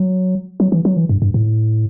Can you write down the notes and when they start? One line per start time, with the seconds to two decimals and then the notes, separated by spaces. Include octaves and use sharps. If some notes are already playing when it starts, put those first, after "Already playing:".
Already playing: F#3
0.60 F#3
0.72 E3
0.85 F#3
0.97 E3
1.09 G2
1.22 G2
1.34 A2